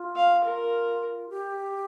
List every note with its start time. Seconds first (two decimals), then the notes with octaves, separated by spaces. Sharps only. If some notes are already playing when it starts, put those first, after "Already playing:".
Already playing: F4
0.16 F5
0.44 A#4
1.30 G4